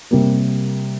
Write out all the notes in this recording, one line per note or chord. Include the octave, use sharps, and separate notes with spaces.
C3 G3 A#3